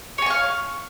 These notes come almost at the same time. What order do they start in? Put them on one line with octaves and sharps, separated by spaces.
C#5 G#5 C#6 F5